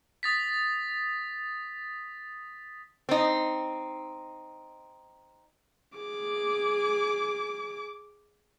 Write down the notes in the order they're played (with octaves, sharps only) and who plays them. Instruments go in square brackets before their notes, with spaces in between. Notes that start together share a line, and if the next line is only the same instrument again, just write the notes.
[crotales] D#6 A6 B6
[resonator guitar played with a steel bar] C4 D#4
[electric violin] G#4 D6